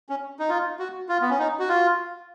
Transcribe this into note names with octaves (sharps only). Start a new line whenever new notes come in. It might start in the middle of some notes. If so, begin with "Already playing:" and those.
C#4
D#4
F4
F#4
F4
B3
C#4
D#4
F#4
F4